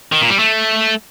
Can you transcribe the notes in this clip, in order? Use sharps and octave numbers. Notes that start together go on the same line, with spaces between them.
D#3
A#2
G3
A3